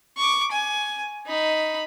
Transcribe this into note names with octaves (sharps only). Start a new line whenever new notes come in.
C#6 D6
G#5
D#4 B5